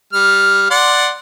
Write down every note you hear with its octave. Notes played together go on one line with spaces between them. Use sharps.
G3 F6
D5 F#5 C6